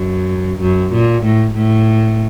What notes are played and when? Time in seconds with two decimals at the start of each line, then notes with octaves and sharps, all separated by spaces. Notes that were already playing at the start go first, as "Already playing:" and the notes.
Already playing: F#2
0.61 F#2
0.93 A#2
1.24 A2
1.55 A2